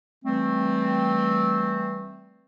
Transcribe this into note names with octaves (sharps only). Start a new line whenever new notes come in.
E3 G3 A3 C4